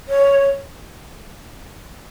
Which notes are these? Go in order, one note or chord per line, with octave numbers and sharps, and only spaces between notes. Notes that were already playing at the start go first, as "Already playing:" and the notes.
C#5